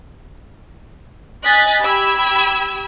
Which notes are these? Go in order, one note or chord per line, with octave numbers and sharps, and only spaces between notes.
D#5 G#5 F#6 A6 B6
G4 B5 E6 G#6